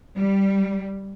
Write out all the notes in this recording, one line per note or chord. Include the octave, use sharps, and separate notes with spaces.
G3